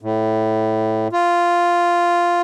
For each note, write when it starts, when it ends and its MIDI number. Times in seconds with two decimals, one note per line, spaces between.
0.01 1.08 45
1.12 2.42 65